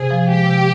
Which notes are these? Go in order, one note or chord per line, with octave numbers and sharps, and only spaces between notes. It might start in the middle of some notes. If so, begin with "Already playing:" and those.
Already playing: C3 G#4
F3
G#3 G4
C3